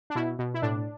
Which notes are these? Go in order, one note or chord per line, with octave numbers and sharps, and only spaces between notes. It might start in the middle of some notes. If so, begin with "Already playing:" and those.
D4
B2 E4
B2
E4
A2 D4